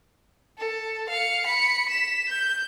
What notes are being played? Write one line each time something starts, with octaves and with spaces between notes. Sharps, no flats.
A4
F5 C#7
B5 C#7
B6 E7
G6